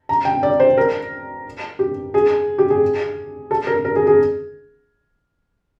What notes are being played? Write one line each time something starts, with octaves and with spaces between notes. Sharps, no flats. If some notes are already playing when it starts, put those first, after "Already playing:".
A#5
G5
D5
C5
A#4
G4
G#4
G4
G#4
A4
A#4
A#4
G#4
G#4